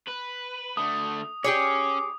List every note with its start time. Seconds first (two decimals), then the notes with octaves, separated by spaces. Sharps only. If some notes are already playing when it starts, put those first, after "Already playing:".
0.07 B4
0.77 D3 A3 D#6
1.44 C#4 G4 G#4 C#5 D6